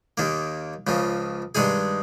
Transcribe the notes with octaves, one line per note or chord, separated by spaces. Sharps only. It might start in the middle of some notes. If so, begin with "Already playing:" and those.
D#2 D#3 A#3
C#2 C#3 F3
G2 D#3 G#3 D#4 G#4